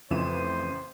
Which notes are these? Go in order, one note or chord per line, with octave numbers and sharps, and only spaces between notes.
A1 F2 C#3 E3 C5 D#7 E7